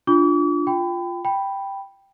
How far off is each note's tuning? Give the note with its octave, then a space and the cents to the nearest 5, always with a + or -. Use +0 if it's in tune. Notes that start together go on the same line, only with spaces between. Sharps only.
D4 +0 F4 +0 D6 -45
F4 +0 G5 +0 B5 +30
G5 +0 B5 +0